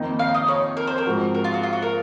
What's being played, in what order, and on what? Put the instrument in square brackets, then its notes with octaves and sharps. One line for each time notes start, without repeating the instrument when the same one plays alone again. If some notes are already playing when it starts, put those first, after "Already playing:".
Already playing: [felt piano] F2 D#3 A#3 D#4
[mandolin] F5
D#5
C#5
A#4
C5
A#4
[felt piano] G#2 F3 C4 F#4
[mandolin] A#4
F4
F#4
F4
F#4
A#4